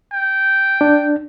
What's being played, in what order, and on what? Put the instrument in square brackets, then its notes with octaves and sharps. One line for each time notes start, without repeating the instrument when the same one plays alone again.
[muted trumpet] G5
[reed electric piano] D4